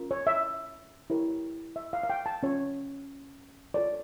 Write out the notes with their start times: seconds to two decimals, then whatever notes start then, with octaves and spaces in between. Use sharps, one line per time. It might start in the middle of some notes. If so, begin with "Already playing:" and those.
Already playing: C#4 F4 A#4
0.11 C#5
0.27 E5
1.10 E4 G4 A#4 C#5
1.76 E5
1.93 F5
2.03 F5
2.10 G5
2.26 A5
2.43 C#4 F4 C#5
3.74 F4 A4 C#5 D5